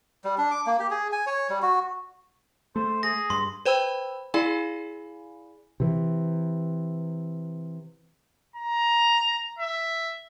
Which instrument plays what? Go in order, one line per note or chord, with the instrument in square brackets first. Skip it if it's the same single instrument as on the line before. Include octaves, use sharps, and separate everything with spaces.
[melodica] G3
D4
D6
A#3
G4
G#4
G#5
C#5
G3
F#4
[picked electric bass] A3 [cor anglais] C5
[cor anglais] G#4 [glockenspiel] A#6
[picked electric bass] G2 [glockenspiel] C6
[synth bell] B4 C5 G5 B5 E6
E4 G#4 D5 F5 G#5 B5
[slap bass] C3 E3
[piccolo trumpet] A#5
E5